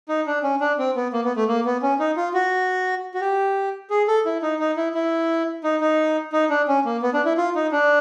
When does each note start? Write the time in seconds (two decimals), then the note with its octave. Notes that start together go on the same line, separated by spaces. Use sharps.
0.09 D#4
0.27 D4
0.43 C#4
0.60 D4
0.78 C4
0.96 B3
1.13 A#3
1.24 B3
1.36 A3
1.48 A#3
1.65 B3
1.82 C#4
1.99 D#4
2.16 F4
2.34 F#4
3.14 F#4
3.21 G4
3.90 G#4
4.08 A4
4.26 E4
4.42 D#4
4.59 D#4
4.76 E4
4.94 E4
5.64 D#4
5.80 D#4
6.32 D#4
6.50 D4
6.68 C#4
6.85 A#3
7.02 B3
7.14 D4
7.25 E4
7.37 F4
7.55 D#4
7.72 D4